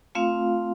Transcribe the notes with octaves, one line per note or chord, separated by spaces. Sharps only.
A3 C4 F4 F5